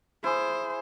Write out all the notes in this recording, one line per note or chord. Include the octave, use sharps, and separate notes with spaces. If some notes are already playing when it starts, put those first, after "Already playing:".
E4 G#4 C5